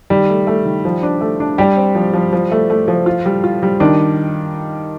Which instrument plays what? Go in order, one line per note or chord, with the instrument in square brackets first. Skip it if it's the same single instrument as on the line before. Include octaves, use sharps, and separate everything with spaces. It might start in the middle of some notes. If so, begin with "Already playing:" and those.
[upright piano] D#3 [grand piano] G3
[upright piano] A3
A3
D#3
F3
D4
A3
D4
[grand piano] G3 [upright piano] G4
[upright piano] C4
F3
F3
F3
A3
A3
F3
F4
G3
F4
G3
[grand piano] D#3 [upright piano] D4